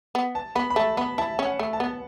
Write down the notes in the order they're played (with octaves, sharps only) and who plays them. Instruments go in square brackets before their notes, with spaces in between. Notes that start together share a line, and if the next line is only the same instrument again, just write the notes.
[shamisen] B3
[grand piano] A5
[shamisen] B3 [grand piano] B5
[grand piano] B5
[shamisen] A3 [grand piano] A5
[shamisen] B3 [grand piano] B5
[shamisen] E4 [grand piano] A5
[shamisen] C#4
[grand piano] F#5
[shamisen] A3
[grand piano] A5
[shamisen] B3